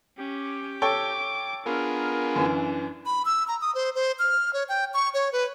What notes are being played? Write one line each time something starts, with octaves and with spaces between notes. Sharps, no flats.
C#4 G4
A4 C#5 G5 D6
B3 D4 F4 G#4 A#4
F#2 E3
B5
E6
A#5
D#6
C5
C5
F6
C#5
G5
C#6
C#5
B4